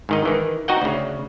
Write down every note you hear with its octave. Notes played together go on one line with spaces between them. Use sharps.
G#2 D#3 D#5
D#3 E3
D#4 F#4 D#5 F#5 G5
D2 C#3